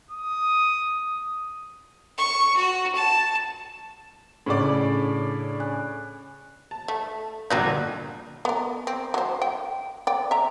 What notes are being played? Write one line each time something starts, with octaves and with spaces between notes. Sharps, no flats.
D#6
C#6
F#4
A5
A2 C#3 D4 D5
G#5 F#6
A5
A3
G1 A#2 F#3 G3 D#4 F#6
B3 A#4
C4
F#3 C5
G5
D5 G5
E5 A#5